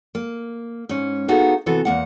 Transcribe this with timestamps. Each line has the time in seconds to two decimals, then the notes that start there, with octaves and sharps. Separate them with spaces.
0.15 A#3
0.89 G#2 C#4
1.28 A#3 B3 D#4 F#4 G#4 A4
1.66 C3 E3 B3 F#4 A4
1.85 E2 A#3 F#5